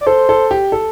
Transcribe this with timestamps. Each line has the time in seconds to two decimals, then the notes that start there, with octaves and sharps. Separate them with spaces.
0.01 D5
0.07 A4 C5
0.29 A4
0.51 G4
0.72 A4